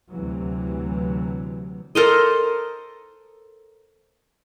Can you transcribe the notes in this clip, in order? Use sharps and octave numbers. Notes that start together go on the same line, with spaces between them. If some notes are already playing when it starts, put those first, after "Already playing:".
D2 C3 E3 F#3
A4 A#4 C5 D#5